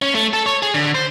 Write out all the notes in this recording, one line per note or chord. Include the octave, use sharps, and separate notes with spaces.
C#4
A3
A4
C#5
G#4
D3
C5